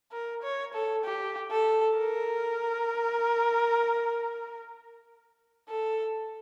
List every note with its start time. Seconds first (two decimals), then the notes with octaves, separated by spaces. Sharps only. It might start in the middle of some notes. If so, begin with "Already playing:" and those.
0.12 A#4
0.43 C#5
0.74 A4
1.05 G4
1.51 A4
1.98 A#4
5.69 A4